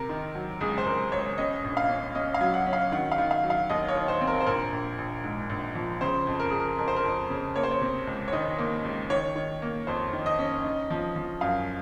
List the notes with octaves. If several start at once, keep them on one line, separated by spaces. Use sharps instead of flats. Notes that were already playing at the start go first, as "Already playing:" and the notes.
Already playing: C3 A#4
D#3
F#3
C#2 G#4
C5
C#2 A#4
C#2 C#5
C#4 D#5
A#1
F5
C#4
C#4 D#5
F5
F#3
F#5
C#4
F5
D#3 F#5
F5
D#3
F5
F#3
F5
D#2 D#5
C#5
D#3
C5
C4
A#4
C5
A#1 A#4
A#1
A#1
G#2
A#1
F3
C#3 C5
F2
A#4
F2 G#4
A#4
F2 A#4
C5
A#4
F2
C#3
A#3 C#5
C5
C#5
C3
C#2
C#5
D#3 D#5
A#3
C#2
D#3 C#5
D#3
A#3
F2 C5
D#3
D#5
C#4
D#4
F3
F3
F#2 F5